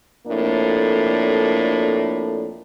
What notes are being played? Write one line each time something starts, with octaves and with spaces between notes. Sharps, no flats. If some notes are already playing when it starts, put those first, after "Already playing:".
F2 A2 A#3 D4